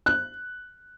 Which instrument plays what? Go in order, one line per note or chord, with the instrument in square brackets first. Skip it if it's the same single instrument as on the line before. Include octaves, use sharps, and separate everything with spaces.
[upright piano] F#6